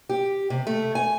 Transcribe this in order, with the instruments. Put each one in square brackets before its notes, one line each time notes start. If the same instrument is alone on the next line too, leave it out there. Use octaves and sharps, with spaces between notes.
[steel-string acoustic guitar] G4
C3
A3
G#5